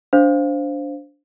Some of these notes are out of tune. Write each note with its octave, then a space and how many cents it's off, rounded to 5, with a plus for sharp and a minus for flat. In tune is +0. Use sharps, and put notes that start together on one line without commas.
D4 -20 C5 +0 F5 +0